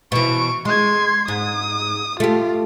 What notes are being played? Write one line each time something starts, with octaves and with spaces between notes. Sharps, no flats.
B2 E3 C#6 D7
G#3 C6 G#6
G#2 D#6
A3 F4 G4